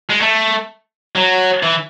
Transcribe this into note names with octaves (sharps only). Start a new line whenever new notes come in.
G#3
A3
F#3
E3